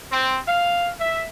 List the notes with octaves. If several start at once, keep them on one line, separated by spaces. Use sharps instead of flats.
C4
F5
E5